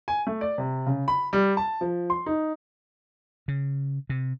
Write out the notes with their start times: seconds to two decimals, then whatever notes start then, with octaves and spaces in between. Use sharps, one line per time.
0.08 G#5
0.27 A3
0.41 D5
0.58 C3
0.86 C#3
1.08 B5
1.33 G3
1.57 A5
1.81 F3
2.10 C6
2.26 D#4
3.48 C#3
4.10 C3